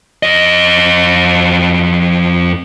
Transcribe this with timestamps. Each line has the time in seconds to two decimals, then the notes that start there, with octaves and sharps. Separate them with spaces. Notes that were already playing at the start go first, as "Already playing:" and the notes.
0.23 F2 D#5